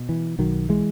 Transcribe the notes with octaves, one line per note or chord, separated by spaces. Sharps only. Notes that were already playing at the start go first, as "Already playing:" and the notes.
Already playing: B2
E3
B1 D#3 F#3
E3 G#3